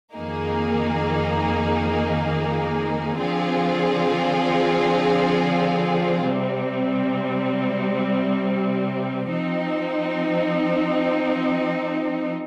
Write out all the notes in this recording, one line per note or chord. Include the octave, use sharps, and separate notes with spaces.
F2 D#3 A#3 D#4 G#4
D3 F3 C4 F4 G#4
C3 G3 C4
F3 C4 D#4